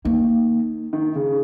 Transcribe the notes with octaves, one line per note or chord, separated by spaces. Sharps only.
D#3 A#3
D#3
C#3